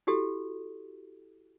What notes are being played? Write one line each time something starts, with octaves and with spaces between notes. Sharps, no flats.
E4 F#4 G4 A4